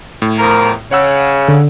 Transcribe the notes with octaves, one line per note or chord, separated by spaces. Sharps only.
A2
E2 F3 A#4
C#3 C#5 F#5 E6
D3